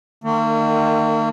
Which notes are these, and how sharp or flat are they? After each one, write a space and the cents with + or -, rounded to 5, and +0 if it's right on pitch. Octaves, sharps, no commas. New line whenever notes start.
D#3 -30 A#3 -45